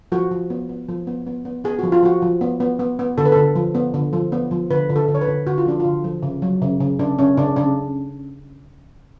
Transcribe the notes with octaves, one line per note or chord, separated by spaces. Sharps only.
F3 F#4
F3
B3
B3
F3
B3
B3
B3
B3 G#4
F3 F#4
F4
F3 F#4
F3
B3
B3
B3
B3
D3 A4
B4
D3 A4
F3
B3
D3
F3
B3
F3
D3 B4
D3
A4
D3
C#5
B4
D3
D3 F#4
F4
F3 D4
D3 F4
F3
C#3
F#3
C#3
C#3
C#3 D4
C#3 C#4
C#3 D4
C#3 D4